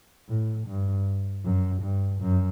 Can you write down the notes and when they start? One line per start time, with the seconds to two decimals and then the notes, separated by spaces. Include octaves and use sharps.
0.28 A2
0.67 G2
1.44 F#2
1.82 G2
2.21 F#2